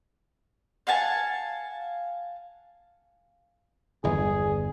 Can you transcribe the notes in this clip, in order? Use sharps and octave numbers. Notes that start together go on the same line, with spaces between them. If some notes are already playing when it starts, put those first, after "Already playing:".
F5 F#5 G#5 A5
G1 E2 G#4